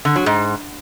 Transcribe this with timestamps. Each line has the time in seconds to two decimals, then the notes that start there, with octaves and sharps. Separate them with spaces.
0.05 D3
0.16 F#3
0.26 G#2